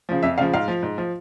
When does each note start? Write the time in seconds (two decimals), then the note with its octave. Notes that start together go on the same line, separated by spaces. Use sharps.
0.09 C#3 F3
0.23 F2 E5
0.38 C#3 F3 F5
0.53 G#2 F5
0.68 F3
0.83 G#2
0.98 F3